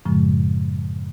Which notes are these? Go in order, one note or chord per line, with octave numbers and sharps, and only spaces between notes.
F#2 A2 C#3 F3 G#3